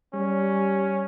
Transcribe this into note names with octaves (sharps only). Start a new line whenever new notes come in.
G3 C#4